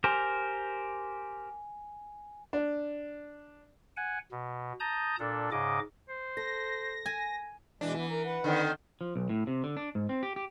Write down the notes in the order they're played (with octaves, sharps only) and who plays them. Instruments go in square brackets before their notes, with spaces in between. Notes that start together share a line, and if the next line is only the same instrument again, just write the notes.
[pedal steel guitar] G4 A#4 C5 [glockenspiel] G#5
[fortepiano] D4
[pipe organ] F#5 G#5
B2
A5 A#5 D#6 G6
A#2 D4 A4
G#2 C#3 D#5 D6
[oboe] C5
[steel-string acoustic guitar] A4 [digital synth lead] A#6
[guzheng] G#5
[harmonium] B2 G#3 [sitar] E3 D4
[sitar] E3 [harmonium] B3
[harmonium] A#4 A#5
B4 F#5
[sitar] D3 D#3 C4
[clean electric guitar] F3
B1
A2
C3
D3
D4
G#2
C4
G4
G4